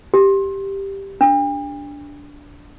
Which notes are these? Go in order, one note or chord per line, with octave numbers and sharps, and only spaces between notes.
G4
D4